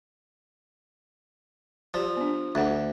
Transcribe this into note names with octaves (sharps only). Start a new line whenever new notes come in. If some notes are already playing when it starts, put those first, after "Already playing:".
F3 G4 D5
B3 D4
D2 D4 A4 F#5